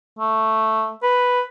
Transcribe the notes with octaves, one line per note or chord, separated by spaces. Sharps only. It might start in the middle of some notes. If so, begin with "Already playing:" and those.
A3
B4